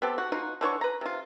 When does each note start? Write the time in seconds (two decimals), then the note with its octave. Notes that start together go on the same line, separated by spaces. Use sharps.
0.02 B3 C4 G4 A4
0.18 F#4
0.32 B2 D#4 F4 F#4
0.61 D3 E3 C#5 C#6
0.81 B4 A#5
1.01 C3 F4